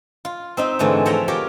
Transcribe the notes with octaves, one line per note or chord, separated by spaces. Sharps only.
F4
C4 D#4 E5
G#2 D3 E3 A3
F3 C#5 E5 F#5 G5 A#5
F4 G4 A#4 C#5 G5